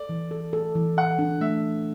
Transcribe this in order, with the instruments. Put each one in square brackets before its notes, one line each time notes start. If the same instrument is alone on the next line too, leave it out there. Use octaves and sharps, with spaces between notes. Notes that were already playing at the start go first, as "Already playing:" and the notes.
Already playing: [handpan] A4 [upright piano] D5
[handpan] E3
A4
A4
E3
[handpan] A4 [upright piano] F#5
[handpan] D4
[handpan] A3 [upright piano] E5
[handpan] E3